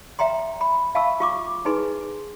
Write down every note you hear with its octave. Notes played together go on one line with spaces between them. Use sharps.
E5 G5 A#5 C6
B5
E5 F5 A5 B5 C#6 E6
F4 C#6 D6
D#4 E4 G#4 B4 G#5 C6